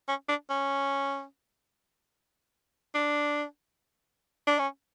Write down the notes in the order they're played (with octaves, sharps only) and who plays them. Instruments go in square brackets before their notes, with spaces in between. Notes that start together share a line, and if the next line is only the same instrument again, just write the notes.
[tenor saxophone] C#4
D4
C#4
D4
D4
C#4